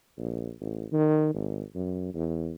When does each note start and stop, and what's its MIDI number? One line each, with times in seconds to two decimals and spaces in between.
0.18 0.51 34
0.61 0.86 33
0.92 1.32 51
1.34 1.63 32
1.75 2.10 42
2.14 2.54 40